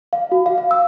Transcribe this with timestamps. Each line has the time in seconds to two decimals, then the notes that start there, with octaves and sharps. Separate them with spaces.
0.13 F5
0.32 F#4
0.46 F5
0.58 F5
0.71 E6